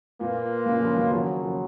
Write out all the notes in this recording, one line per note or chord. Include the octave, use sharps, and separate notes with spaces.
A#2 A#3 F4 B4
A#2 C#3
C#3 F3
D#3 F#3
A#2 C#3 F3 F#3 A#3
C#3 F3